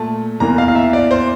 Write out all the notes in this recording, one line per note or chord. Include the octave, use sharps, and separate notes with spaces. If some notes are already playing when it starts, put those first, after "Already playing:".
Already playing: A#2 A3 A5
E2 E3 A#3 A#5
F5
F5
E5
D5
C5